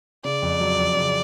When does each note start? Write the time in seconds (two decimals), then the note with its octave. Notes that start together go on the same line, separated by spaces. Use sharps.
0.24 C#3 D5
0.42 F2
0.60 F#3
0.78 F2
0.97 C#3